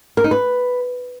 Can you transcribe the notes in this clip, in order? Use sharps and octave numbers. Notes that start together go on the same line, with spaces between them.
A#4
D#4
B4